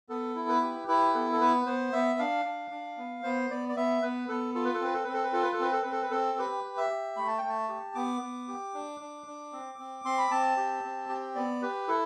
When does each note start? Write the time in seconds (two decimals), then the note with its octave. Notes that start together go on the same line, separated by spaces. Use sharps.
0.09 B3 A4
0.35 E4
0.49 B4
0.62 G4
0.88 E4 B4
1.14 B3 A4
1.33 A4
1.41 B3 B4
1.66 B3 C5
1.93 B3 E5
2.19 D4 F5
2.45 D4
2.71 D4
2.98 B3
3.23 B3 C5
3.50 B3 D5
3.69 D5
3.76 B3 E5
4.02 B3 B4
4.28 B3 A4
4.55 F4 A4
4.65 B4
4.74 A4
4.81 C4 B4
4.94 A4
5.04 C4 B4
5.14 A4
5.23 B4
5.33 F4 A4
5.42 B4
5.53 A4
5.59 C4 B4
5.73 A4
5.82 C4 B4
5.92 A4
6.02 B4
6.11 C4 A4
6.38 G4 B4
6.64 G4
6.77 E5
6.90 G4
7.17 A3 B5
7.27 A5
7.38 A3 G5
7.49 A5
7.69 G4
7.95 B3 D6
8.22 B3
8.48 G4
8.74 D4
9.00 D4
9.27 D4
9.52 C4
9.78 C4
10.05 C4 C6
10.18 B5
10.31 C4 A5
10.57 G4
10.84 C4
11.09 G4
11.35 B3 D5
11.62 G4 B4
11.88 E4 A4